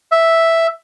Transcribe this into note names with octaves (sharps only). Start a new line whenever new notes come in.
E5